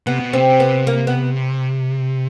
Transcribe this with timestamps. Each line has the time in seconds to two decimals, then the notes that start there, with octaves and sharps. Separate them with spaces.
0.07 C3 B3
0.20 B2
0.33 C3 C4
0.60 B3
0.87 A#3
1.07 B3